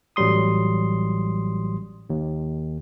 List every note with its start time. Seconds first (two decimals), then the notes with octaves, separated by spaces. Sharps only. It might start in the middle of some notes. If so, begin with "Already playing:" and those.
0.16 A1 F#3 G3 C6 D#6
2.10 D#2